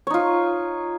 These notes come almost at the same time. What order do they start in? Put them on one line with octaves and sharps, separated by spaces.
C#5 D#4 F4